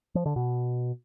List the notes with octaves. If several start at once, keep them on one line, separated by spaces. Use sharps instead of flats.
F3
D3
B2